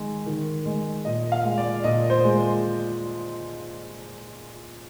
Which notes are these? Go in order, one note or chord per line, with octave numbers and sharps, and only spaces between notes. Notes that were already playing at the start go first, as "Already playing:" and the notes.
Already playing: D#3 G#3
D#3
G#3
A#2 D#5
F5
G#3
D5
A#2 D#5
C5
G#3